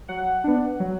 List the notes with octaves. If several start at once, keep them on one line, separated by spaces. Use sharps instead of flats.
F#3 F#5
B3 D4
F#3